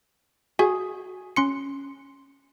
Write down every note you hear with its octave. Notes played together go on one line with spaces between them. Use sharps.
F#4 G#4
C#4 C6 C#7